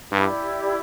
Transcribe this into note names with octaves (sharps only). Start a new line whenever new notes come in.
G2 E4 G4 D5